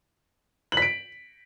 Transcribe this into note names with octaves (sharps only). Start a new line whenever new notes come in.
F#7
B6
D7